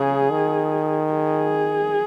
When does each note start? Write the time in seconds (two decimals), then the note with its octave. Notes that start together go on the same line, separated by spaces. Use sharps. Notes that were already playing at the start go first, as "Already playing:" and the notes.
Already playing: C#3 G#4
0.30 D#3
1.13 G#4